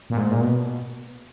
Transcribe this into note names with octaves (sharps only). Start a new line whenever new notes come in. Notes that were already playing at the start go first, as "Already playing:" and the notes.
A#2
G#2
A#2
B2